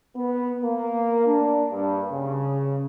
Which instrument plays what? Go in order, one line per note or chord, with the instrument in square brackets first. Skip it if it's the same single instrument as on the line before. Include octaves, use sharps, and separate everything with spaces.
[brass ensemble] B3
A#3
D4
G2
C#3